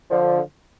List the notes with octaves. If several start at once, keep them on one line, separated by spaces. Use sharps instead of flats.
D3 F3